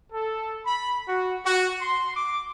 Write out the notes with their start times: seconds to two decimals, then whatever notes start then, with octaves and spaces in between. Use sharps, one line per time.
0.13 A4
0.66 B5
1.08 F#4
1.46 F#4
1.81 C6
2.16 D6